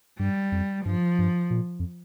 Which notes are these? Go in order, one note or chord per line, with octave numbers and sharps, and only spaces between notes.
G2 G3
F2
G2 F3
G2
A#2
F2